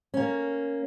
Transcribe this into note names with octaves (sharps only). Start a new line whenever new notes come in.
A#3 C#4